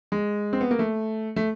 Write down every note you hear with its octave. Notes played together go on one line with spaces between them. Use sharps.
G#3
C4
B3
A#3
A3
A3